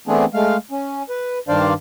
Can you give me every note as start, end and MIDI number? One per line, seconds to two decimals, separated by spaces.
0.07 0.25 52
0.07 0.25 57
0.07 0.25 59
0.07 0.25 60
0.07 0.25 62
0.07 0.25 68
0.34 0.57 56
0.34 0.57 57
0.34 0.57 77
0.71 1.03 61
1.09 1.39 71
1.48 1.73 43
1.48 1.73 51
1.48 1.73 62
1.48 1.73 72
1.48 1.73 74
1.48 1.73 77